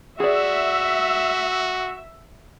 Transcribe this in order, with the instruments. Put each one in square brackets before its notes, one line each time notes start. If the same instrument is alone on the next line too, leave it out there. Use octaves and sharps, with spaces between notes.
[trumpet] F#4 [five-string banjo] G#4 D5 [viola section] E5